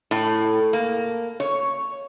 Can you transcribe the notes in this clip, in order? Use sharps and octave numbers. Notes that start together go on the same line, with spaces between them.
A2
A#3
C#5